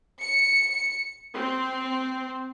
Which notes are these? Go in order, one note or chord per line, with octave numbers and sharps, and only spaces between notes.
C#7
C4